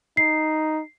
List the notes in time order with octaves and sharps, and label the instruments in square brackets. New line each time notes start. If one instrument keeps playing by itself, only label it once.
[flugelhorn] D#4 [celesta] C7